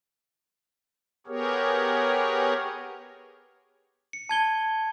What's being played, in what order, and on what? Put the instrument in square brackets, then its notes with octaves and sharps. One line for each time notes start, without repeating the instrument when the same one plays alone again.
[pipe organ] B3 G4 G#4 A#4 C#5
[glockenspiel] C#7
A5 G#6 G7